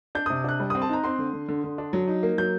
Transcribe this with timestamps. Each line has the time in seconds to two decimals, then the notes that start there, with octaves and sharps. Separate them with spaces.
0.15 D4 G6
0.26 C3 D#6
0.44 D4 F#6
0.60 G3
0.70 C4 D#6
0.82 A5
0.89 D#4 A#5
1.04 C4 C6
1.19 D3
1.33 D3
1.48 D3
1.64 D3
1.78 D4
1.93 F#3
2.08 D#4
2.23 A#3
2.38 F#3 G6